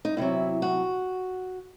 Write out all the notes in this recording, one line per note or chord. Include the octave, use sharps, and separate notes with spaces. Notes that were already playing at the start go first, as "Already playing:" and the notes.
D#4
E2 C3 D#3 F#3 E4
F#4